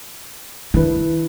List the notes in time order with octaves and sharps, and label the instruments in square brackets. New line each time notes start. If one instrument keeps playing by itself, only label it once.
[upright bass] D#3 [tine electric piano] D4 E4 B4